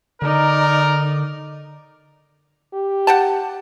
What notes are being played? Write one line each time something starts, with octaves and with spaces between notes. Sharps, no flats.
D3 D#4 A#4 D5
G4
F#5 G5 A5